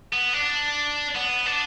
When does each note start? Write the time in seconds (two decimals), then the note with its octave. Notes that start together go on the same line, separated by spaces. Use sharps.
0.13 B3
0.33 D4
1.15 B3
1.46 D4